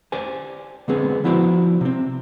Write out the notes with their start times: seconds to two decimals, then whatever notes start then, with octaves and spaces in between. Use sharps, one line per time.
0.12 G4 C5 D5 G#5
0.88 D3 G#3 B3 C4 G#4
1.24 F3 B3 E4 F#4 C5 D5
1.81 C3 C4